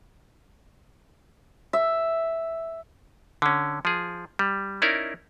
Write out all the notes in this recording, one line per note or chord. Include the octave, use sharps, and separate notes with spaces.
E5
D3 C#4
F3 G#4
G3
C#4 D#4 E4 A#4 D5